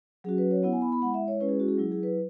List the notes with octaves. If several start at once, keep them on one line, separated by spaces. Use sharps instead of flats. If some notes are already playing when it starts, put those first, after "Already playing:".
F#3 C#4 F#4 G#4
B4
C#5
B3 E4 F#5
G#5
B5
B5
G#3 E4 F#5
E5
C#5
G#3 C#4 E4 B4
G#4
F#4
G#4
F#3 E4
G#4
B4